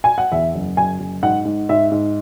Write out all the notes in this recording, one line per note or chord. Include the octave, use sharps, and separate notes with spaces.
G#5
F#5
E2 E5
F#1
F#1 G#5
F#1
G#2 F#5
G#2
G#2 E5
G#2